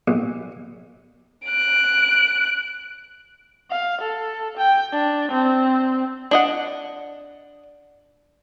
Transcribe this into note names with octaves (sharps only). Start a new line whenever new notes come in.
A#1
F#6 D7
F5
A4
G5
D4
C4
D4 D#5 F#5